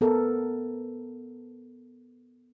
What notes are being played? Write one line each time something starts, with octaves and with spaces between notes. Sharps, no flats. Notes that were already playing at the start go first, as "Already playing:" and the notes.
B3 A4 A#4